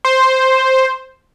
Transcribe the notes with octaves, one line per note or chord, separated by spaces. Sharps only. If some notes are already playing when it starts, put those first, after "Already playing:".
C5